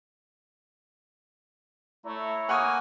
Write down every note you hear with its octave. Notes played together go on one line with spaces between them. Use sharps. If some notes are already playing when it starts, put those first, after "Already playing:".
A3 E4 C#5 A#5
A#3 F#5 G#5 C#6 D#6